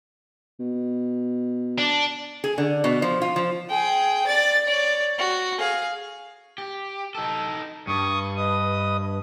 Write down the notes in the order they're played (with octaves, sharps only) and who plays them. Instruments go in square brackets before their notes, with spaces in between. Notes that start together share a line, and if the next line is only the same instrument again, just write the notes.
[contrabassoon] B2
[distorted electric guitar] D4
[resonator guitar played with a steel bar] G#4
D3
B2
F3
F4
F3
[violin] G#4 G5
D5 A6
C#5 D5
F#4
G#4 F5
[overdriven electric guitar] G4
D#4 A4
[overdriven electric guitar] G2 [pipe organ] C#6 D#6
[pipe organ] B4 D#5 D#6